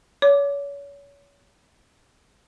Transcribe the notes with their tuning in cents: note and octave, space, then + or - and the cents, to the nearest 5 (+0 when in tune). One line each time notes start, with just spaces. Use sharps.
C#5 +35 D6 +0